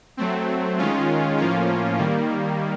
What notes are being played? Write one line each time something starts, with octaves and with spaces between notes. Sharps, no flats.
F#3 A3 C4
D#3 G#3 C#4 F4
A2 F3 A#3 C#4 F4
D#3 G3 A#3